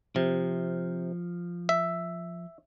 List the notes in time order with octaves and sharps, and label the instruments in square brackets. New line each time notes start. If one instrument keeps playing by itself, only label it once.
[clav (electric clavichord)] C3 [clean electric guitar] F3
[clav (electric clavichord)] E5